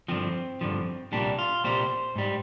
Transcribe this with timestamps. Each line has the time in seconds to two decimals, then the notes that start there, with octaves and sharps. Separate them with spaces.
0.08 G2 D3 F3 C4
0.61 G2 D3 F3
1.13 C2 A#2 G3 D4
1.39 F4
1.64 C2 A#2 G3 C5
2.16 G#2 G3